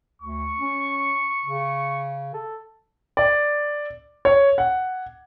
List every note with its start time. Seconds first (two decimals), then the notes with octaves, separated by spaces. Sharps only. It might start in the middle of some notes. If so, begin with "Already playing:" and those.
0.22 D2 C#6
0.59 C#4
1.46 C#3
2.34 A4
3.17 D5
4.25 C#5
4.58 F#5